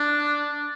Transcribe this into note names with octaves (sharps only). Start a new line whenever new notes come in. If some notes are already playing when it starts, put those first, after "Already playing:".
Already playing: D4